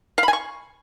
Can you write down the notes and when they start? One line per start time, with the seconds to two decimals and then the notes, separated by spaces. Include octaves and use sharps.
0.18 F5
0.23 B5
0.28 G#5
0.33 C#6